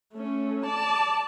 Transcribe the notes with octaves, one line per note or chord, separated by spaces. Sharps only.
A3 C#4
D5 A5